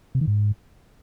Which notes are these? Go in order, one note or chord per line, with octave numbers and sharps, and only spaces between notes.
C3
D#3
G#2